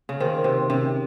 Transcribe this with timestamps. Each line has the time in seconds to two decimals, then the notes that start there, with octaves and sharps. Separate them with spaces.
0.09 C#3
0.20 D#3 C5
0.44 C3 C5
0.70 C3 C#4